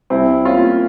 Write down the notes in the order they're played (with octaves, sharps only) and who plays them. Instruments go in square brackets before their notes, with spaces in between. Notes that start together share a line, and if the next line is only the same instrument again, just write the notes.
[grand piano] C2 C4 E4
A#3 C#4 F4